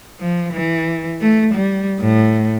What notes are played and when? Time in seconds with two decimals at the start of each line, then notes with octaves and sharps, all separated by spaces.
0.20 F3
0.53 E3
1.21 A3
1.54 G3
2.00 A2